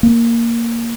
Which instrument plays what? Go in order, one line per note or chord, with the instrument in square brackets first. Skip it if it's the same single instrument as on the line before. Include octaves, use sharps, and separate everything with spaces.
[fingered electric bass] A#3